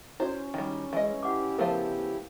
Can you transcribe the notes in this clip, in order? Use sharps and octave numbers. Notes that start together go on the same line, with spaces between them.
C#4 E4 F#4 C5 D5
D#3 G3
E3 G#3 D#5
E4 G4 F#5 D6
C#3 F3 A3 B3 A#4 C5 F5